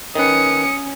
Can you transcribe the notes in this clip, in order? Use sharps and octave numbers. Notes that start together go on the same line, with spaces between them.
D#3 C#4 B4 D#6 C#7